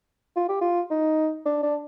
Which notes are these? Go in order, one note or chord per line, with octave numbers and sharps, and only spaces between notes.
F4
G4
F4
D#4
D4
D4